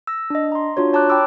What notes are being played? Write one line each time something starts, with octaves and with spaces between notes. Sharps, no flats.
E6 A#6
D4 D#5
A#5 C6
D4 F4 F#4 C#5
C#5 A5 A#5 D6 F#6
G5 A5 B5 D6 E6